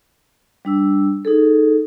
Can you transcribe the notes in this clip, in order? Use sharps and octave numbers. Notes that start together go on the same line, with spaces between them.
G3 D4 E6
D#4 G#4 A4